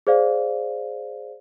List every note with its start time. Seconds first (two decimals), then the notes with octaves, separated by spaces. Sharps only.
0.07 G#4 C5 D5 F5